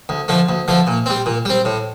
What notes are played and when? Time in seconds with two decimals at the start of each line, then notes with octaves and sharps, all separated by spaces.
0.09 D2
0.28 D3 F3 A3
0.49 D2
0.68 D3 F3 A3
0.87 A#2
1.06 G3 C4
1.26 A#2
1.45 G3 C4
1.65 A2